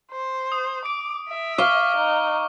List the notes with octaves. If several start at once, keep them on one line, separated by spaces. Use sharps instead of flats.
C5
D#6
D6 D7
E5
F5 C#6 D6 G7
D#4